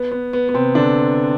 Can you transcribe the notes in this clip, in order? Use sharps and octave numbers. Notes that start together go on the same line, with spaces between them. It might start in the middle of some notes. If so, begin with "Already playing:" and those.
Already playing: B3
B3
B3
B3
C3 C4
D3 D4